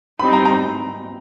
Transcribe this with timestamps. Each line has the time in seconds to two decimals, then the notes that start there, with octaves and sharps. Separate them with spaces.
0.19 G3 C4 D#4 B5
0.33 A#5
0.45 A#5